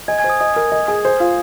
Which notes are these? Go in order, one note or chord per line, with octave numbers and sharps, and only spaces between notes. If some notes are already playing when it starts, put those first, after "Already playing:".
D#5 G#5 G#6
G#5 G#6
C5
D#6
D#5 D#6
A#4
D#5
G#4
C5
F4